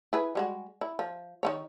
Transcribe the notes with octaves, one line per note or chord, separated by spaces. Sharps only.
E4 G#4 B4
G3 G#3 F#4
E4
F3
D#3 A#3 C#5